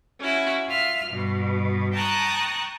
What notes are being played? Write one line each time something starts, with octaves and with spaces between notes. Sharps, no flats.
C#4 E4 F#4
F4 E5 F6
G2 B2
G5 A5 A#5 C#6 D#6 F#6